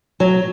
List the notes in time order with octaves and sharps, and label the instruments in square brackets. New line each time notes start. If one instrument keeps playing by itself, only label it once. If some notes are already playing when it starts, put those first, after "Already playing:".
[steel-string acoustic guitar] F#3